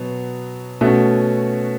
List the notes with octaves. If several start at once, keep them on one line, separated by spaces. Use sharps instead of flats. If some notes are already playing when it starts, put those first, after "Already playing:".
Already playing: B2 F#3 B3
B2 A3 C#4 F#4